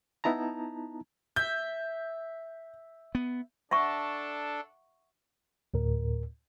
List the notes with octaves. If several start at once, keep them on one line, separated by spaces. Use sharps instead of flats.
B3 D#4 E4 A5 A#5
E5 G6
B3
D4 A4 E5 F#5 C#6
D2 A2 A#4